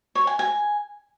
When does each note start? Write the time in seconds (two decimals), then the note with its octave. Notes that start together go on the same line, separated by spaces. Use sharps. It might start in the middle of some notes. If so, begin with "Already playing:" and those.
0.15 C#5
0.27 G#5
0.39 G#5